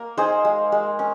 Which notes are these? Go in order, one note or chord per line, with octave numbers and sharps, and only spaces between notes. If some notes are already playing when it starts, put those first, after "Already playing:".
Already playing: A#3 A#4
D#4 G#4 C5
G#3
G#3
C#4